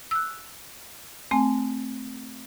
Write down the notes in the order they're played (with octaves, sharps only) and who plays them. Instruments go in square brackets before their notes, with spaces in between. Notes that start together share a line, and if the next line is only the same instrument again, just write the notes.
[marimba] E6 F#6
A3 C4 G#5